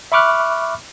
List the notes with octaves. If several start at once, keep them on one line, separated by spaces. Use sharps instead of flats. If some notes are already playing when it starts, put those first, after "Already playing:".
E5 B5 C#6 D6 F6 F#6